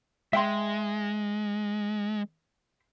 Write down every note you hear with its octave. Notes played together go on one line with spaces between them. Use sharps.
G#3 E5 G5 C6